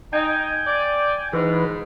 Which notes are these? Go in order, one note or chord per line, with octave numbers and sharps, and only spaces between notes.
D#4 G5 G#5
D5
G#2 E3 B4